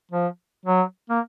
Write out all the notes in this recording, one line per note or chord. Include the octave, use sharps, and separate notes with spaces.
F3
F#3
A#3